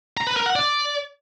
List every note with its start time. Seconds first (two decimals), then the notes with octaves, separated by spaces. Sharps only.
0.17 A#5
0.27 B4
0.36 A#4
0.46 F#5
0.56 D5